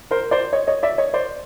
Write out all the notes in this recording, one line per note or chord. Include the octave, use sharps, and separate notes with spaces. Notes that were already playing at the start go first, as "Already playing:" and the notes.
A#4 C5
C5 D5
C#5 D#5
C#5 D#5
D5 E5
C#5 D#5
C5 D5